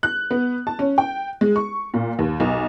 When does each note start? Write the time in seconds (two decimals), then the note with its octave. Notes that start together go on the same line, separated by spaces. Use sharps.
0.03 F#6
0.31 B3
0.67 A5
0.79 C#4
0.98 G5
1.41 G#3
1.56 C#6
1.94 A#2
2.19 D#2
2.40 B1